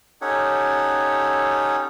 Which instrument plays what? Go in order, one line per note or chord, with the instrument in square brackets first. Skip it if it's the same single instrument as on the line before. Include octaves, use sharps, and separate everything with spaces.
[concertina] C#4 D#4 G4 A4 C#5 F#5